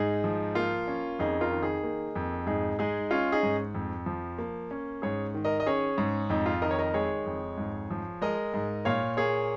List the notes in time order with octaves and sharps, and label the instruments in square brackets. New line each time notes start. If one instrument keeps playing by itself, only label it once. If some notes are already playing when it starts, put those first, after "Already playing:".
Already playing: [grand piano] G#2 D#4 G#4
F3
A#3 F4
C#4
F2 D#4 G#4
F4 A#4
D#3
D#4 G#4
A#3
F2
G#2 D#4 G#4
G#3 D#4 G#4
C#4 F4
D#4 G#4
G#2
F2
F3
A#3
C#4
G#2 G#4 C#5
D#3
A#4 D#5
D#5
C#4 G#4 C#5
G#2
F2 D#4
F4
D#3 A#4 D#5
C#5
A#4 D#5
G#3 G#4 C#5
F2
G#2
F3
G#3 A#4 D#5
G#2
A#2 C#5 F5
A#3 G#4 C#5